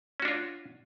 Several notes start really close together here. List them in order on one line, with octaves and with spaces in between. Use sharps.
C#4 F#4 D4 F4